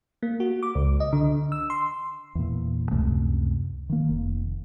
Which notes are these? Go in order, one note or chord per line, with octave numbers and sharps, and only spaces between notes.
A#3
F#4
D6
C#2
D#5
D3
E6
C6
E2 A#2
C#2 F#2 C3 A3
D#3 A#3
F1